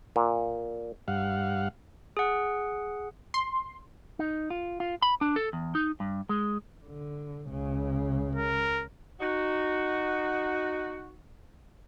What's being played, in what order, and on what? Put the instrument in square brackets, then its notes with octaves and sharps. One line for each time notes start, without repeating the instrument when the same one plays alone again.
[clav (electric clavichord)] A#2
[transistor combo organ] G2 F5 F#5
[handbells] G#4 F#5
[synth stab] C6
[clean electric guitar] D#4
F4
F4
B5
D4
A4
E2
D#4
G2
G#3
[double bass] D3
C#2 C#3
[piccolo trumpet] A#4
[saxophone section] D#4 F#4